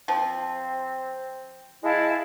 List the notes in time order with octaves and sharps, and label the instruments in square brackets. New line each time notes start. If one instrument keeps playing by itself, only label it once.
[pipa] F3 [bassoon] C4
[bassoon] G#3 [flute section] E4 F5 A5